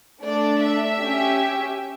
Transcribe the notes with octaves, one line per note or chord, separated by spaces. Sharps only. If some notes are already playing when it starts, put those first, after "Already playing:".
A3 D4 A4 D5
E5
C#4 G4